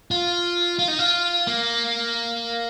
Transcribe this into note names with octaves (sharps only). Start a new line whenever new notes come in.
F4
F4
D#4
F4
A#3